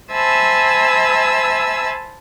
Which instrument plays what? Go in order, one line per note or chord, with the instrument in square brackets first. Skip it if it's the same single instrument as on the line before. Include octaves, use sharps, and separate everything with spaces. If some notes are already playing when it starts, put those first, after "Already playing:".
[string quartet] C5 E5 G#5 A5 B5 E6